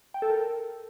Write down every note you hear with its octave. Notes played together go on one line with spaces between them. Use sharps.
G5
A4
A#4